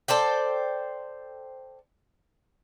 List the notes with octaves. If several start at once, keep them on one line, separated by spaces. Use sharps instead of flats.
A4 C5 D5 G5